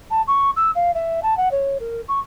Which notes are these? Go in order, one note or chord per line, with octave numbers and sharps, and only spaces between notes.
A5
C#6
E6
F5
E5
A5
F#5
C#5
A#4
C#6